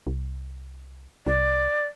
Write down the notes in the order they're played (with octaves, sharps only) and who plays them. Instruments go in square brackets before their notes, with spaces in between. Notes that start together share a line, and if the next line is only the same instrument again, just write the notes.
[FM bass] C2
[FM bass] C2 [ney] D5